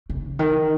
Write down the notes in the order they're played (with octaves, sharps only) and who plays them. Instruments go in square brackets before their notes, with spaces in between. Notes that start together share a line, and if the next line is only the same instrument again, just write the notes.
[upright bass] C#3
D#3